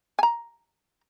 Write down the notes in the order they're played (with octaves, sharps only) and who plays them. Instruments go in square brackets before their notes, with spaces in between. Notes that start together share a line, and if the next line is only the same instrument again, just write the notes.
[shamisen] G#5 A#5